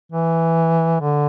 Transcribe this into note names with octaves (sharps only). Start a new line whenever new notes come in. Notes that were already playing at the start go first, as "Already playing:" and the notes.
E3
D3